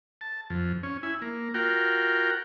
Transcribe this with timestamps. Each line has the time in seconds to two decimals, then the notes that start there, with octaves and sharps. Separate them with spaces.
0.21 A5
0.50 F2
0.83 C#4
1.03 E4 G#5
1.22 A#3
1.54 F4 F#4 A#4 G5